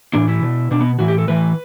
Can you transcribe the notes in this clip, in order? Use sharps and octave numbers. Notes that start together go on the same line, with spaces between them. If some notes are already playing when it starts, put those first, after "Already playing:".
A2 E3 D4
E4
B2
B2 D4
B3
A2 E3 F#4
G4
A4
A2 E3 B4